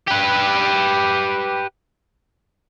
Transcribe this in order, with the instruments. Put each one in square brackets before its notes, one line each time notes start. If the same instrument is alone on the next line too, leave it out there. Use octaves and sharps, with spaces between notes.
[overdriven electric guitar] G4 B4